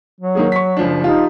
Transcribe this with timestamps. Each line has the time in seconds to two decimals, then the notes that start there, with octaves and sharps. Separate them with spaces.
0.21 F#3
0.35 D#3 A#3 G#4
0.52 C#6 B6
0.77 F#1 F3 D4
1.04 F3 D#4 F4 G4